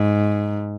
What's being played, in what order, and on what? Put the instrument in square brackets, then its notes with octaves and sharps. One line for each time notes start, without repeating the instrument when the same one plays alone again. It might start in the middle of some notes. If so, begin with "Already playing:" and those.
Already playing: [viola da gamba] G#2